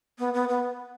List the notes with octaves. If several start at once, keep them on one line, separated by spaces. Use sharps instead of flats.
B3
B3
B3